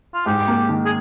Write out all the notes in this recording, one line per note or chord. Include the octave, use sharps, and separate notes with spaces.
F4
G#2 G4
A#3
D#3
G#4